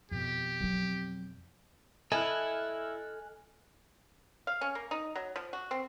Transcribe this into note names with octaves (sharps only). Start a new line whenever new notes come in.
F2 B2 G4
F#3 C4
E4 A4 D#5 G#5 F6 F#6
F5
C#4
A#3
D#4
F#3
F3
F#4
C4